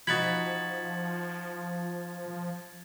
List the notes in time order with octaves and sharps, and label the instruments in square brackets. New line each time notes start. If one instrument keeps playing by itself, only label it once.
[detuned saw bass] F3 [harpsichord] D#4 F#4 B5 [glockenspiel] G#6 A6